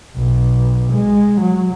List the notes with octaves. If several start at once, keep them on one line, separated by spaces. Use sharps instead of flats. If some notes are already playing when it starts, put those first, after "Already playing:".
B1
G#3
F#3